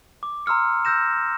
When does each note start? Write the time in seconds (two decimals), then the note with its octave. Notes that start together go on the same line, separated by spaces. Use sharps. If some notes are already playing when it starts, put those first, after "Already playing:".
0.23 D6
0.46 A#5 C6 E6 F6 C#7
0.85 E6 F6 G6 A#6 E7